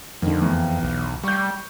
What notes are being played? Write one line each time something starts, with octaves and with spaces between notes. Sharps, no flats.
F2 D3 D#3
E2
B1
G3 C#6 G6